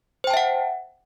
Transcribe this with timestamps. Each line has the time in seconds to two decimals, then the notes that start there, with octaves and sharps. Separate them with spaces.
0.24 C5
0.27 G5
0.30 A5
0.34 E5
0.37 F#5